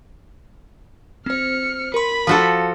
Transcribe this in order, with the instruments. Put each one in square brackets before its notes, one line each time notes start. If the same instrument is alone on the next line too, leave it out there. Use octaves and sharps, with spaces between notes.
[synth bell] C4 C5 [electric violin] F6 C#7
[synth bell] A#4 C6 [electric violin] B5
[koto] F3 F#4 A4 [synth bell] F5